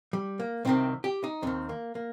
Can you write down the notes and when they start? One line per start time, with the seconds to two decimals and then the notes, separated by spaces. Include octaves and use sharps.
0.13 G3
0.39 A#3
0.65 C2 C3 D#3 C4
1.04 G4
1.24 D#4
1.42 D#2 D#3 C4
1.69 A#3
1.95 A#3